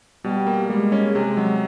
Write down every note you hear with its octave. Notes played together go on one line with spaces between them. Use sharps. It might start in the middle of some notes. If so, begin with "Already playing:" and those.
B2 G3
A#3
G3 G#3
C#4
C3 G#3
F#3